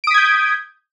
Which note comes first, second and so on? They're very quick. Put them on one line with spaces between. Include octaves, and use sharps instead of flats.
D7 D#6 B6 G#6 G6